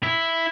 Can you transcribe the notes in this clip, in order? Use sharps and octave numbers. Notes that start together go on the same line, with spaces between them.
E4